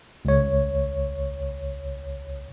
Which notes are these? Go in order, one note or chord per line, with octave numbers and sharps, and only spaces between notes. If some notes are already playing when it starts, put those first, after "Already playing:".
C#2 C#5